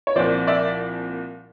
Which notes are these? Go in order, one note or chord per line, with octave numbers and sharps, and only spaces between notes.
C#5
C2 A#2 F3 C5 D5
D5 E5